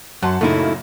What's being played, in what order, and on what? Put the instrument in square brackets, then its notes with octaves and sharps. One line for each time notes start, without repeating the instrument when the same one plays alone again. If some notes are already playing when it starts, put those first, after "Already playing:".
[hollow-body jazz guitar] F#2 [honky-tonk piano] F#5 A5 C6
[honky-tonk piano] F#2 A#2 C#3 [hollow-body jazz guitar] A3 D#4 E4